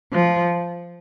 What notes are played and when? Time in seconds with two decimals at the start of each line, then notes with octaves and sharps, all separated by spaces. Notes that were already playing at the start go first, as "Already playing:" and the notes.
0.12 F3